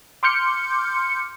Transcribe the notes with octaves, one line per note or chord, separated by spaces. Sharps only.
C6 D6 F6 G6 C#7